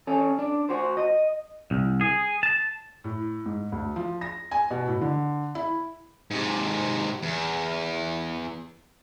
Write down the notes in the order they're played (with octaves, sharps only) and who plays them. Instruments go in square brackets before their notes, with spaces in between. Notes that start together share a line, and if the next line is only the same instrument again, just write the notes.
[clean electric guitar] C#4 A4
D4
F#4 C5
D#5
C2
G#4
A5
[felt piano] A2
G#2
D2
F3
A#6
G#5
B2
A2
D3
E4
[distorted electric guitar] G#2 C3
E2